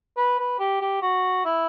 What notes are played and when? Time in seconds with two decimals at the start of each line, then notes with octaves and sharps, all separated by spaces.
0.17 B4
0.39 B4
0.59 G4
0.81 G4
1.02 F#4
1.45 E4